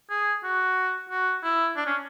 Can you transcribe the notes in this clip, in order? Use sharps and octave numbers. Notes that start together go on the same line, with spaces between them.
G#4
F#4
F#4
E4
D4
C#4